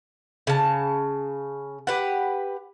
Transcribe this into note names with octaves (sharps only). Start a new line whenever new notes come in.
C#3 A5
G4 B4 F#5